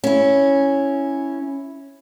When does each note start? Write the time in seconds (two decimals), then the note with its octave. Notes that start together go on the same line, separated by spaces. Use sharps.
0.04 C#4 E4